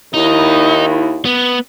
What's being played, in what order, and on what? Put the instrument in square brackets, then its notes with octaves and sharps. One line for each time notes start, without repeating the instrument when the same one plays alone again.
[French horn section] D#2 D#3 E4 [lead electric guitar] D#4
[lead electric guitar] B3